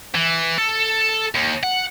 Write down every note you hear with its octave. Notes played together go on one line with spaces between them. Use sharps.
E3
A4
D#2
F#5